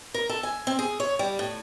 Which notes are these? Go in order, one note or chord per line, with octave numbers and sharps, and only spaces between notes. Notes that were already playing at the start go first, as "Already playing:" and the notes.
A#4
A4
G#5
C4
G#4
C#5
G3
A2